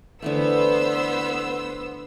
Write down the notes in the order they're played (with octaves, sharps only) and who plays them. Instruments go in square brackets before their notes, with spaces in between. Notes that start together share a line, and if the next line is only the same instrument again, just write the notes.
[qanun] D3 E3 A3 [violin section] B3 C5 E6